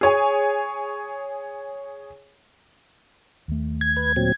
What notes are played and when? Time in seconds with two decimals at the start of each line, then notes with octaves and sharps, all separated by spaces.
0.01 G#4 C#5 G#5
3.48 D#2 A3
3.81 G#6
3.97 B4
4.16 A#2 F#3 C4